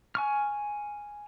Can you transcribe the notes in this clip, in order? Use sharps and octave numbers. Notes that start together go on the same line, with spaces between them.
G#5 C#6 F6